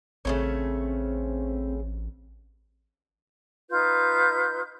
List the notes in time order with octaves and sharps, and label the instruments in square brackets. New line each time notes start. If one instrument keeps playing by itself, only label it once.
[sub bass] A1 [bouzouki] C#3 A3 C#4 [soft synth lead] C4
[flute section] D#4 F4 B4 G6